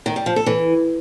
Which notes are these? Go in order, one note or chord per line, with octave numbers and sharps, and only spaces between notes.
D#3
G3
F3
A4
E3